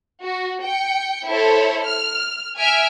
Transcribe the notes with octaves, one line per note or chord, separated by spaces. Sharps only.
F#4
G5 C#7
E4 A4 C5 C#5
F6
E5 G#5 F6 D7